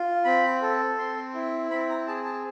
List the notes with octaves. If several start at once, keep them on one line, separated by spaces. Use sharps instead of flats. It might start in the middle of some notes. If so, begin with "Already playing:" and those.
Already playing: F4
C4 B5
A4
C4 C6
E4
C4 B5
A#5
G#4 A5
A5